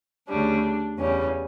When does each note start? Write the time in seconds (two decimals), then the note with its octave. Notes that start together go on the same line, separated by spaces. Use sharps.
0.28 D2 C#3 G3 D4
0.98 E2 C#3 G3 C#4